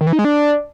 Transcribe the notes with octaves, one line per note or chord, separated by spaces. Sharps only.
D#3
E3
D#4
G#3
D4